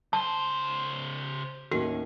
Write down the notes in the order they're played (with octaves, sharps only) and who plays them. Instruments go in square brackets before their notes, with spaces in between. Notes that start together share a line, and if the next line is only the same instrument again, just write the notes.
[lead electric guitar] C#3 C5 [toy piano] A5
[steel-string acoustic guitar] D#2 A2 C#4 [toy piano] F#4